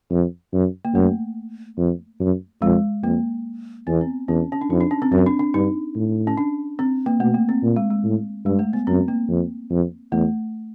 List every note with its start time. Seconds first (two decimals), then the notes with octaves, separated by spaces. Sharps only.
0.11 F2
0.53 F#2
0.85 A#3
0.94 F#2 A3
1.78 F2
2.20 F#2
2.62 F2 G#3
3.03 F2 A#3
3.87 E2 B3
4.01 C4
4.28 E2 C#4
4.52 C#4
4.61 D4
4.70 F2 D#4
4.81 D4
4.91 C#4
5.02 C4
5.12 F#2 C4
5.26 D4
5.39 D4
5.54 G2 D#4
5.95 A2
6.27 C#4
6.37 D4
6.79 C4
7.06 A#3
7.20 B2 A3
7.34 A#3
7.49 C4
7.62 A#2
7.76 G#3
7.91 G#3
8.04 A2
8.45 G2 G#3
8.59 A3
8.73 B3
8.87 F#2 C4
9.08 A#3
9.29 F2
9.71 F2
10.12 E2 A3